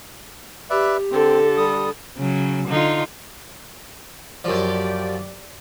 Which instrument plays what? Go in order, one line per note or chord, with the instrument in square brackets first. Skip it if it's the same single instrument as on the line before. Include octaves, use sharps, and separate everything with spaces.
[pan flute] G4 [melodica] B4 D5 E5
[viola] D3 A4 [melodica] C4
[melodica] G3 D#6
[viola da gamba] C#3 F#3
D3 D#4 F4
[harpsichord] F#2 F3 [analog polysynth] G4 D5